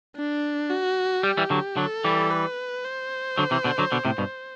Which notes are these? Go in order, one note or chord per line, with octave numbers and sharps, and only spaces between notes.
D4
F#4
G3 G4
E3 G3
D3 F#3
D3 F#3 A4
E3 G3
B4
C5
D3 F#3
C3 E3
B2 D3
D3 F#3
B2 D3
A2 C3
G2 B2